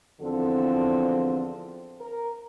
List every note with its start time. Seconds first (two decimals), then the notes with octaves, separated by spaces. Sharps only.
0.20 E2 D3 F3 C4 A4
2.00 A#4